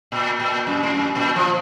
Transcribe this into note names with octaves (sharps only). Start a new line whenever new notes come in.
A#2
A#2
F#2
A2
F#2
A#2
F3